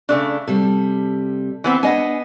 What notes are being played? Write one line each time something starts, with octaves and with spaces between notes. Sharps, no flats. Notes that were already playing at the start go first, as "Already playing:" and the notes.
C#3 A3 D4
C3 G3 A4
E3 B3 C4
B3 D4 D#5 F#5 G#5